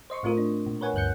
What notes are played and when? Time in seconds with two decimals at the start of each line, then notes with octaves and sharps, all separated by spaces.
0.10 C5 D#5 C6 C#6
0.23 A2 A3 C4 F4 A#4 D#6
0.37 D4
0.66 A#2
0.81 A#4 B4 C#5 F#5 G#5
0.94 D2 G2 F#6 G6 C#7